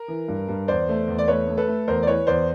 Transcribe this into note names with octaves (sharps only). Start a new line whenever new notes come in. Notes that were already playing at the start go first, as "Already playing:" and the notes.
Already playing: A#4
E3
G2
G2
E2 C5 D5
A3
E2
D5
A3 B4 C#5
A3
A4 B4
A3
E2 A#4 C5
D5
E3 B4 C#5
E2 C5 D5